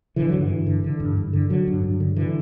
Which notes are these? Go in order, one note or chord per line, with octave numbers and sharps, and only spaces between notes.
D3 E3
G2 F#3
E3
G2
D3
D3
G2
G2
D3
D3 F#3
G2
G2
D3
D3 E3